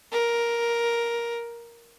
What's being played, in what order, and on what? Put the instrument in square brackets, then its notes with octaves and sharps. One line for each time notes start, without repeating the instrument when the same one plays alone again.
[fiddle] A#4